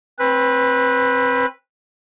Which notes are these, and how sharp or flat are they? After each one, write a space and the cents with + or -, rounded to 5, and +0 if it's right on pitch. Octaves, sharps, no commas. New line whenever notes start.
C4 +25 B4 -5